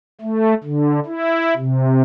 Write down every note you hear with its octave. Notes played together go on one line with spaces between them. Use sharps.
A3
D3
E4
C3